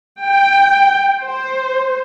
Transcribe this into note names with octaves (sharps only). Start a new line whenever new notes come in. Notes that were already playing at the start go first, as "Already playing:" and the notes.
G5
C5